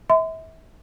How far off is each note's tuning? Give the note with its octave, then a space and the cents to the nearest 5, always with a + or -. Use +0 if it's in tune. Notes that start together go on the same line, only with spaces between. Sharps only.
E5 -35 C6 -40